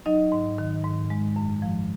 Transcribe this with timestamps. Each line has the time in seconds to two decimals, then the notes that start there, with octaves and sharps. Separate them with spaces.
0.06 F#3 D#4 D#5
0.32 G#2
0.58 D#3
0.84 G#2
1.10 G#3
1.36 F#2
1.62 F3